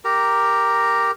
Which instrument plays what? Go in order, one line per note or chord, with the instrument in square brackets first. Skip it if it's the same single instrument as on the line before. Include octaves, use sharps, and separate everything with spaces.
[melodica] G4 A#4 A#5